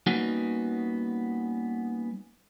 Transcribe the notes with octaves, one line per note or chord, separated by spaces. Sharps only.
G3 A#3 B3 C#4 D#4 F#4